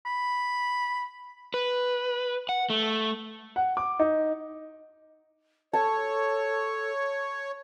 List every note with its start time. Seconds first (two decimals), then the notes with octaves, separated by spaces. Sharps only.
0.06 B5
1.54 B4
2.49 F#5
2.70 A3
3.56 F#5
3.77 D6
3.99 D#4
5.73 A4 C#5 A5